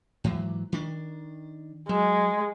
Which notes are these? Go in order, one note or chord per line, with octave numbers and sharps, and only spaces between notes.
G#2 E3 F#3
D#3 D4
F#3 G#3